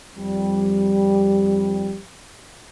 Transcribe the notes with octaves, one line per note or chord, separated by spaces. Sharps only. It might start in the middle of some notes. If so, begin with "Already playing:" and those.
F2 G3